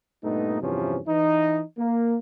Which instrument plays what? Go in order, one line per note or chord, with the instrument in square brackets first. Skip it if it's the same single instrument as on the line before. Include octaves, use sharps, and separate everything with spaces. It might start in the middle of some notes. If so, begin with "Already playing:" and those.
[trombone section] G2 A#2 A3 B3 D#4
E2 G2 C3 E3 F3 C#4
E3 D#4
A#3